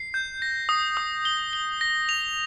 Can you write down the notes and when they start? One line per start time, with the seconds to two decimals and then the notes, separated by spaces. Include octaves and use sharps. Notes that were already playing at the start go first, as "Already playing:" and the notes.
Already playing: C7
0.14 G6
0.42 A#6
0.69 D#6
0.97 D#6
1.25 G7
1.53 G7
1.81 A#6
2.09 F7